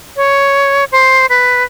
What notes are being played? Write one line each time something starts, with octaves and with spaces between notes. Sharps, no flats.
C#5
C5
B4